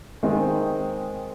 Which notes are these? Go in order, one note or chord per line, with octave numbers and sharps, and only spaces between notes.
D#3 G#3 C4 D#4